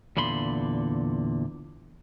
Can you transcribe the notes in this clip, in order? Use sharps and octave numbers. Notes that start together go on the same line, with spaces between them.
E2 A#2 D3 B5 C6